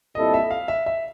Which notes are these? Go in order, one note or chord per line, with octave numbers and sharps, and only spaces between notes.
A#2 G3 C4 E4 A4 D#5
E5
F5
E5
E5